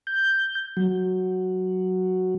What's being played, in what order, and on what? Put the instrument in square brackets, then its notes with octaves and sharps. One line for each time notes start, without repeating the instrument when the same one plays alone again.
[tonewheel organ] G6
F#3